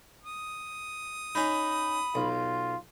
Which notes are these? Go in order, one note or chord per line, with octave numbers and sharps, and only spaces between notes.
D#6
C#4 D#4 B5
B1 F4